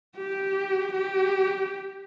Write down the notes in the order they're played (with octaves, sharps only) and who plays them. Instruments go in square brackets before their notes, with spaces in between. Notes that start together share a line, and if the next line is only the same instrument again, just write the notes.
[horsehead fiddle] G4
G4